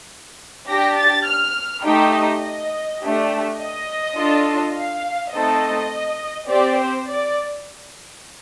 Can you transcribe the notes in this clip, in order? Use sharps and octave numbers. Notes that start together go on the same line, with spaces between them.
D4 G4 A#6
A6
F6
A3 D#4 G4 G5
D#5
D#5
A3 D4 G4
D#5
D4 F4 A4
F5
A3 C4 D#4 A4 D#5
C4 G4 D5
C5
D5